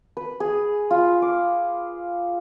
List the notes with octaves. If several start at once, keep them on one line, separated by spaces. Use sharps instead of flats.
B4
G#4
F4
D6